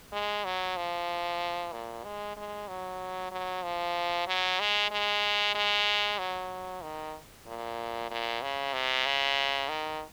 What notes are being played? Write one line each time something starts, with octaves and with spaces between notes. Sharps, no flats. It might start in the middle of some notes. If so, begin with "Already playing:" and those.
G#3
F#3
F3
A#2
G#3
G#3
F#3
F#3
F3
F#3
G#3
G#3
G#3
F#3
D#3
A#2
A#2
C#3
C3
C#3
D#3